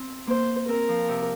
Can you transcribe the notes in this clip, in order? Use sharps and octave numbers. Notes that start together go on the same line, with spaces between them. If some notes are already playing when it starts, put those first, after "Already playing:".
Already playing: C4
A#3 C5
C4 A#4
F3
C3